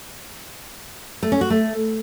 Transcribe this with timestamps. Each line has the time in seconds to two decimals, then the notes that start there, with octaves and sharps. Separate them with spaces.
1.23 A3
1.32 C#4
1.41 F#4
1.50 A3